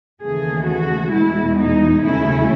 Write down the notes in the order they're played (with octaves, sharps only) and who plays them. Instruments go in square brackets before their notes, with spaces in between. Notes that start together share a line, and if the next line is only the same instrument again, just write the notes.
[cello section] D#2 C#3 E3 A3 G#4
F#4
E2 B2 G#3 E4
D#4
D#2 C#3 F#3 A3 C#4 E4